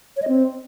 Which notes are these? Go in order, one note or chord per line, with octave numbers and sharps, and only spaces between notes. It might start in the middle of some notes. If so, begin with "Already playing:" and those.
C#5
D#5
C4